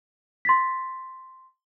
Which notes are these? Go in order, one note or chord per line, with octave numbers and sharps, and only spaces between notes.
C6 A6 B6